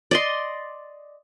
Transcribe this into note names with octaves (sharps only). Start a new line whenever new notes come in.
D5 D#5 C6